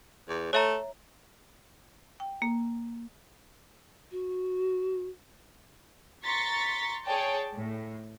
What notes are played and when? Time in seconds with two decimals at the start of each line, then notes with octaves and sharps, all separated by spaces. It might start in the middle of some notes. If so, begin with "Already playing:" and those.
0.29 E2
0.53 A3 C#5 E5 A#5
2.20 G5
2.42 A#3
4.11 F#4
6.24 A#5 C6 C#6 A6 B6
7.04 G#4 C#5 D5 G5 A5
7.55 A2